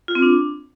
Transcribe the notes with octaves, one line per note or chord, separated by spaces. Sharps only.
F4
C4
D4